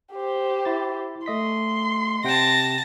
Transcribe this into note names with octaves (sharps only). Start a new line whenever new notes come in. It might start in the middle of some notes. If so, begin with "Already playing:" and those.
G4 C5
E4 A6
A3 D#5 C6 B6
C3 F#5 G5 A5 A#6